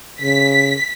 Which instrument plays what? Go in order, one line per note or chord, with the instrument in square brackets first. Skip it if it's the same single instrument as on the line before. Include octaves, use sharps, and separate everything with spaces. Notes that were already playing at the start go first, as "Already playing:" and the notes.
[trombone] C#3 [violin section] B6